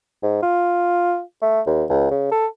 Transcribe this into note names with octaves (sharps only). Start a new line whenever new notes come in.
G#2
F4
A3
D#2
C#2
C#3
A4